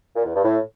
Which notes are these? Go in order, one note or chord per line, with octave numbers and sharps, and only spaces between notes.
A#2
E2
G2
A2